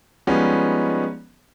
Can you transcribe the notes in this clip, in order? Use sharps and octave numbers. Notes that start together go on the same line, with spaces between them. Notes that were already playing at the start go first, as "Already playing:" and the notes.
F3 G3 G#3 B3 C#4 D#4